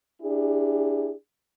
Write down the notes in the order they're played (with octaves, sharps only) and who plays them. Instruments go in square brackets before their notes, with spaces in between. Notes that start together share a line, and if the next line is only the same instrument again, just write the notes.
[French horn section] D4 E4 G4 G#4